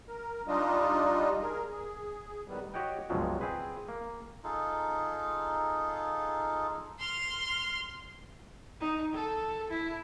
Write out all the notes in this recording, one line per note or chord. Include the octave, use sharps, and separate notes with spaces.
A#4
G3 D4 D#4 F4 D#5
G#4 A#4
G#4
A2 D#3 G3 B3
F#4 G4 C#5 D#5 F#5 G5
C#2 G2 B2 F3 F#3 G#3
C4 G#4 B4
A#3
D#4 F4 G#4 A4
C6 F6
D#4
A4
E4